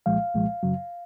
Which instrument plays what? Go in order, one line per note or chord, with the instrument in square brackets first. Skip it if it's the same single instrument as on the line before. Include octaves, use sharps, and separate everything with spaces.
[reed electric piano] C2 A#2 F3 G#3 F5
C2 A#2 F3 G#3
F#2 C#3 F#3